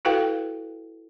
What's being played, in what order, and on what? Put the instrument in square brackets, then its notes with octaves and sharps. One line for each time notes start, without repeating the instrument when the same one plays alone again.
[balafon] E4 F#4 A4 B4 F5 G5